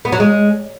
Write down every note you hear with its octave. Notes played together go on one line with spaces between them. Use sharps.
B3
F#3
G#3